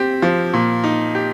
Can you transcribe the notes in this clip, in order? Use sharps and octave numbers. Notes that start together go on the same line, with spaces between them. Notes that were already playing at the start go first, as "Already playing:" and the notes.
Already playing: C4 G4
F3
A#2
D#4
G4